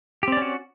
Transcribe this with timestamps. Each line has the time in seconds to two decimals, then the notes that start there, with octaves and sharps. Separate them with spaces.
0.23 G4
0.28 C4
0.32 D5
0.37 C#4
0.42 F#4